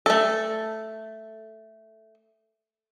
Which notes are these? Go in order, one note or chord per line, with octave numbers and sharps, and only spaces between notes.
A3 A4